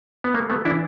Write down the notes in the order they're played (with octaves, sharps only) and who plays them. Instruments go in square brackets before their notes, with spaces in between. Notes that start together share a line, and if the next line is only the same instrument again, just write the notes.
[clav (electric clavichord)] B3
A3 A#3
A3 B3
E3 D4 E4